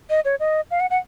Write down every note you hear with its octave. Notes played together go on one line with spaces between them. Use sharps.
D#5
C#5
D#5
F5
F#5
F#5